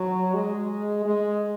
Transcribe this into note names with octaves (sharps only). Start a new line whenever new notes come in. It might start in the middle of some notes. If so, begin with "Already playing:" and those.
Already playing: F#3
G#3
G#3